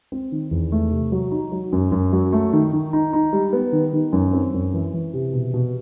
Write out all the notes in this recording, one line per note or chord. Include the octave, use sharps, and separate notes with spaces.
C4
D#3
E2
A3
C3
F#3
D#4
F#3
F#2
F#2
F#3
A3
D#3
D#3
D#4
D#4
G3
B3
D#3
D#3
F#2
C4
F#2
E3
E3
C3
B2
B2